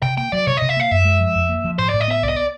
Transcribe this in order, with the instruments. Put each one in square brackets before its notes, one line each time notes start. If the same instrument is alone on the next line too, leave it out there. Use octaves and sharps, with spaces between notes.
[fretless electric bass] C3 [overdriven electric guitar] G5
[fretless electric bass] A#3 [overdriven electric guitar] G5
[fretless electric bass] F#3 [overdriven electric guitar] D5
[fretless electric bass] C3 [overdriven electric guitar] C#5
[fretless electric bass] C3 [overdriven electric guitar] D#5
[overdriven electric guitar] E5
[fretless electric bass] A#3 [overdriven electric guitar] F5
[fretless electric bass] F#2 [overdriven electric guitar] E5
[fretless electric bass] G#3
F3
F2
A#3
F3
[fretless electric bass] A2 [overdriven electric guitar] C5
[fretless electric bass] A2 [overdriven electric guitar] D5
[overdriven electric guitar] D#5
[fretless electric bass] B3 [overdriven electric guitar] E5
[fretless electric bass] C2 [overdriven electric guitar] D5
[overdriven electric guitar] D#5
D5